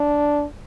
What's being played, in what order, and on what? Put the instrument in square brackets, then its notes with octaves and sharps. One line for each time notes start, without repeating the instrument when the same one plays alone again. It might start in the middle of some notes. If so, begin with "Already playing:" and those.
Already playing: [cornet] D4